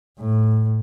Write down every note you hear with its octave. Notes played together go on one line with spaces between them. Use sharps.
A2